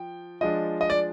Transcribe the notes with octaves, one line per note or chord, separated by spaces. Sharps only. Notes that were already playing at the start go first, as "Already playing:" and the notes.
Already playing: F3 G5
F3 G#3 D4 D#5
D#5
D5